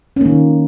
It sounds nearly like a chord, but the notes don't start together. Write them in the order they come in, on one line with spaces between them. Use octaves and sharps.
C#4 A#3 D#3